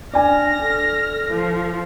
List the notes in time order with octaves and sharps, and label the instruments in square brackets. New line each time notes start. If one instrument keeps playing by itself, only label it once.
[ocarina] D4 [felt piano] D5 G#5 [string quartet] F6 A#6
[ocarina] A4
[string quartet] F3